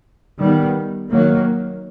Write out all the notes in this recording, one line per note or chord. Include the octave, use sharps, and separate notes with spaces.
D#3 G3 B3
D#3 F#3 A#3